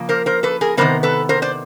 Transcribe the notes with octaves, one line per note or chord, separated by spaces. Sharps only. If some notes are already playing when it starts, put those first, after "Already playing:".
Already playing: C#3 F3 A#3
A#4 C5
A#4 C5
A4 B4
G#4 A#4
C3 D#3 G3 B3 A#4 C5
A4 B4
A#4 C5
C5 D5